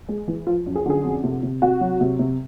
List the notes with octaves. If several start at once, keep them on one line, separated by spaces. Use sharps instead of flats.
G#3
E3
F3 F4
F#2
G#4
D3 G#4
F2
C3
C3
C3 F#4
F#3
C3
C3